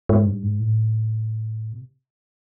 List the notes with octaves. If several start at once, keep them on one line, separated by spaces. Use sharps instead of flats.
G#2
G2
G#2
A2
C3